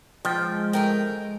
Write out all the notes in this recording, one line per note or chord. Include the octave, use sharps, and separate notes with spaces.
F3 G#3 G5
A3 A#4 G5